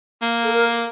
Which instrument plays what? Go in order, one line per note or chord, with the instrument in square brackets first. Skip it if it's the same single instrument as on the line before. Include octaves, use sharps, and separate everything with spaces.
[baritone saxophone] A#3
[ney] A4
A#4